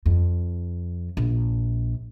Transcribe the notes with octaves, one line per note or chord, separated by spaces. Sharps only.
F2
A#1